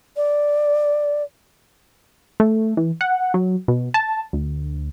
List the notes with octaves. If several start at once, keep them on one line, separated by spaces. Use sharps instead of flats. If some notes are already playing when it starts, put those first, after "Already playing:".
D5
A3
E3
F#5
F#3
B2
A5
D2